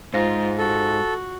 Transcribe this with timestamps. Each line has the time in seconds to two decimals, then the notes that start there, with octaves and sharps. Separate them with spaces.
0.14 G#2 F4 C5 F5 A#6
0.58 F#4 A4